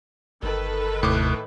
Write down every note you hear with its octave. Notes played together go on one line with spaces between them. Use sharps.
G1 D#3 A4 B4
D#2 A2 C3 D6 F#6